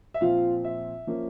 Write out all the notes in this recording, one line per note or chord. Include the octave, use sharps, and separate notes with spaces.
E5
A#2 F3 C4 F4 F5
E5
F3 A#3 C#4